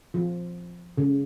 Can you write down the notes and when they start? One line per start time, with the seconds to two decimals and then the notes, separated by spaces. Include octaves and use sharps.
0.14 F3
0.98 C#3